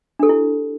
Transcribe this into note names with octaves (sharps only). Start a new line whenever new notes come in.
D4 E4 G4 A4